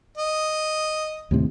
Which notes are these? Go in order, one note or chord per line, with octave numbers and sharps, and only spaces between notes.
D#5
D#2 A2 C3